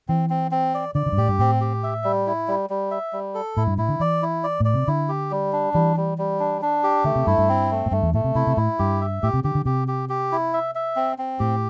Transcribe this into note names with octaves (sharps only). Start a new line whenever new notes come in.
E3 C4
C4
C4
D5
D3 D5
D3
G2
A2 G4
G2
A2 C4
G4
E5
G3
E4
G3
G3
E5
G3
A4
A2 E4
G2
A2 E4
D3
E3 D5
E4
D5
A2 D5
C3
D3 E4
G4
G3
D4
E3 G3
G3
G3
D4
D4
G4
D3 A3
C3
G2 E4
G2
C4
A3
A2
G2 A3
E2
A2 A3
C3
C3 E4
C3
A2 E4
G2 G4
E5
A2 G4
C3
D3 G4
D3
C3 G4
G4
G4
E4
E5
E5
C4
C4
A2 G4